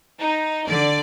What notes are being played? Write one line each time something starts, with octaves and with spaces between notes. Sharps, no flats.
D#4
D3 D5